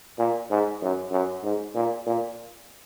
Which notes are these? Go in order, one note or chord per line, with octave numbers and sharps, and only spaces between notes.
A#2
G#2
F#2
F#2
G#2
A#2
A#2